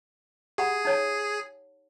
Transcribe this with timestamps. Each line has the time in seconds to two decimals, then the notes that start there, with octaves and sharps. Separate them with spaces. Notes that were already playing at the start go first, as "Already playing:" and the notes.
0.58 G4 G#4 F#5 B5
0.85 D#4 C#5 A5